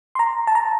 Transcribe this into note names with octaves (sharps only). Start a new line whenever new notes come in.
C6
A#5
A5
A#5